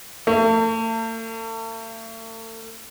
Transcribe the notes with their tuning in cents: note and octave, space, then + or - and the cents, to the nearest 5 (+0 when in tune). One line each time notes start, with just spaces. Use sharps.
A3 +40